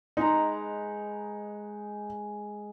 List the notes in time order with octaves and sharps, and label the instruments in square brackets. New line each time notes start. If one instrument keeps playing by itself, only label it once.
[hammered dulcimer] G#3 B4 A#5 [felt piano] D#4